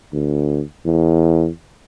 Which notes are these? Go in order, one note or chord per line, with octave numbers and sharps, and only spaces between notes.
D2
E2